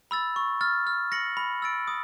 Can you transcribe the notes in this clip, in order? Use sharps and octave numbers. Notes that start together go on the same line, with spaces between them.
B5 E6 A6
C#6
F6 A6
F6
A#6 C#7 F#7
B5
E6 A6 D7
D#6